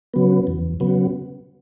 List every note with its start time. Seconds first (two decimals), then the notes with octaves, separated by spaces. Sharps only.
0.14 C#3 F#3 B3
0.47 E2
0.80 C#3 F#3 B3